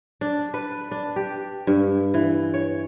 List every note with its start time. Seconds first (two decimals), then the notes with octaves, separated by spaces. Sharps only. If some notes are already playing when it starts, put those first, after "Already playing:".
0.21 D4
0.54 B4
0.91 D4
1.16 G4
1.67 G2
2.14 E3
2.54 C#5